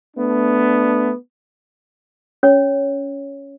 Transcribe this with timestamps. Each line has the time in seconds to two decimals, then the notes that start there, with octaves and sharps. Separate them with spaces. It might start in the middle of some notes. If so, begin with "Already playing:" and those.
0.17 A3 B3 D4
2.43 C#4 C#5